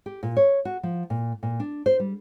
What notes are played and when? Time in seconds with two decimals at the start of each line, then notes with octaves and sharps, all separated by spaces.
0.06 G4
0.23 A#2
0.37 C#5
0.65 F#4
0.83 F3
1.10 A#2
1.43 A#2
1.60 D4
1.86 C5
2.00 G3